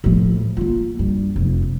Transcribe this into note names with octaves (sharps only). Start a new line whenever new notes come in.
A2 F3
A#3 F4
G2
F1 F3